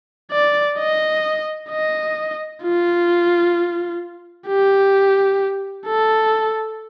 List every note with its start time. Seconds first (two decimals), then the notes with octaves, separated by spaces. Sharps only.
0.32 D5
0.78 D#5
1.70 D#5
2.63 F4
4.47 G4
5.86 A4